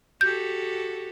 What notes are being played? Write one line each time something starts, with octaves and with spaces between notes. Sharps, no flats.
F#4 G4 A4 G6